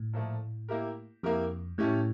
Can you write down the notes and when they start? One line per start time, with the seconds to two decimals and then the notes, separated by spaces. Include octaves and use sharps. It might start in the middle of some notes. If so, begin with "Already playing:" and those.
Already playing: A2
0.13 A#2 F3 A3
0.68 A#3 E4 G4 A#4
1.23 F2 A#3 E4 G4 A#4
1.78 A2 A3 C#4 G4 C#5